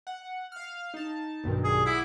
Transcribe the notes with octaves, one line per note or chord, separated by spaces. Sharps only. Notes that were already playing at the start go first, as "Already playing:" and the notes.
F#5
F5 F6
D#4 A5
B1 G2 D#3
G#4
E4 F#5 D6